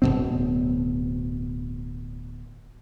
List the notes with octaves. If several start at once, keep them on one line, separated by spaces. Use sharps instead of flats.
D1 C#2 B2 C4